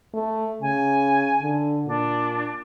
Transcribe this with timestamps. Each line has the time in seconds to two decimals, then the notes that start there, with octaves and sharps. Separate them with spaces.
0.14 A3
0.62 C#3 G#5
1.42 D3
1.87 A#2 D4